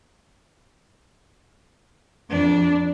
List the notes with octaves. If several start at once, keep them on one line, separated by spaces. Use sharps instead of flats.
F2 D4